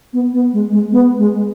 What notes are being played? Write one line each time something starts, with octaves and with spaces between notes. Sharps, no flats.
B3
B3
G#3
G#3
B3
G#3